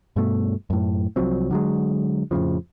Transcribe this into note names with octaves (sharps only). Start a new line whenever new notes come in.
G2 B2 A3
F#2 A2
C2 F3 F#3 C4
D3 F#3 G#3
F2 A2 C#3 F3